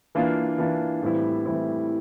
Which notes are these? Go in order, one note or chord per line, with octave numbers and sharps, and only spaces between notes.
E3 A#3 D4 F4
E3 A#3 D4 F4
A2 E3 G3 C4 E4
A2 E3 G3 C4 E4